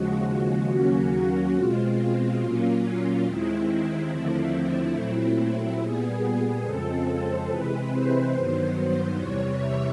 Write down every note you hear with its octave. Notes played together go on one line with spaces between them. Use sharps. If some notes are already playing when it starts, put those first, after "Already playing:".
Already playing: D#2 C#3 F3 G#3 F#4
D#2 C#3 F#3 A#3 C#4
B2 G#3 C4 F4
A#2 F#3 A#3 C#4 F4
D#2 D#3 G#3 C4 E4
D#2 D3 F3 A3 C4 E4
A#2 F#3 A3 C4 E4
A#2 G3 B3 G#4
F2 C#3 F3 G#3 C4 A4
C3 E3 G#3 C4 B4
C5
G2 D#3 F#3 B3
E2 C3 E3 G3 C#5
E5